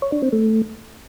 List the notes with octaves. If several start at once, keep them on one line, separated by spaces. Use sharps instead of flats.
C#5
D4
C4
A3